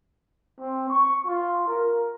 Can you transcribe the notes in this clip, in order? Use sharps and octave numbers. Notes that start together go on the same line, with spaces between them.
C4
C#6
F4
A#4